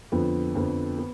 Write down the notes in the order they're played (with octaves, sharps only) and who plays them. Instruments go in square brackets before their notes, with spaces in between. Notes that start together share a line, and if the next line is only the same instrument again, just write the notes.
[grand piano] F2 D3 F3 B3
F2 D3 F3 B3
B3